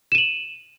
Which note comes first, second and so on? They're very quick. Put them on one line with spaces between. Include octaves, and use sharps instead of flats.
E7 D#7 F#7